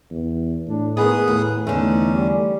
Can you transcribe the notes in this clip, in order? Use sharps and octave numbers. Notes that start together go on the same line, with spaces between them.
E2
A2 D4
D#3 G#3 B3 G#4 B4 D#6
D#2 A2
E2 D3 A3 C#4 D#4
G3